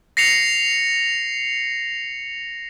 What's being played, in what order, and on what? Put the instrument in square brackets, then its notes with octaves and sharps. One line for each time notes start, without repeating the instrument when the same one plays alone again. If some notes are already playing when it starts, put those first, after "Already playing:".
[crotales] A#6 C7 C#7 F7